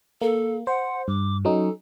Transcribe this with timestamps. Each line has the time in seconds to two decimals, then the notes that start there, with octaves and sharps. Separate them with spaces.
0.21 A#3 A4
0.67 C5 F#5
1.08 G2 D6
1.45 F#3 C#4 D#4 A4